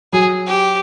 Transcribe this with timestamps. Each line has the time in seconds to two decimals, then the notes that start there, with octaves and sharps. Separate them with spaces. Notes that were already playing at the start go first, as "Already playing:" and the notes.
0.13 F#3 G#4
0.47 G4